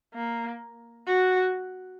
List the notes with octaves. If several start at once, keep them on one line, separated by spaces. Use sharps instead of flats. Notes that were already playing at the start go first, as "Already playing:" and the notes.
A#3
F#4